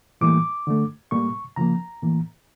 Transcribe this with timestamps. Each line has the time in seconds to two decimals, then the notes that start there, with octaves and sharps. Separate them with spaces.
0.21 A2 E3 G3 A#3 D6
0.67 D3 A3
1.11 A2 G3 A#3 C#6
1.56 C#3 F3 A#3 A#5
2.02 A2 E3 A#3